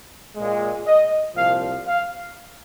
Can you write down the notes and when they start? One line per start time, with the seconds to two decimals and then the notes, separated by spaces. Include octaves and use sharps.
0.37 A#2 G#3
0.86 D#5
1.36 C2 A#2 F3 F5
1.86 F5